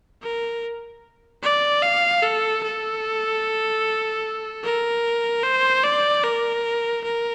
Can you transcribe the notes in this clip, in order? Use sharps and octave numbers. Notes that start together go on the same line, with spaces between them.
A#4
D5
F5
A4
A4
A#4
C5
D5
A#4
A#4